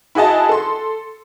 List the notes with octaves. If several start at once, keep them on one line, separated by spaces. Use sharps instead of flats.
E4 F#4 G#4 D#5 A5
A4 C6